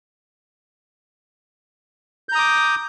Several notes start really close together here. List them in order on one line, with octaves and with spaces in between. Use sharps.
G6 A#5 D#6 D6